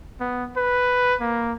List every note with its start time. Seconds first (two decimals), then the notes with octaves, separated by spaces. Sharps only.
0.20 B3
0.57 B4
1.21 A#3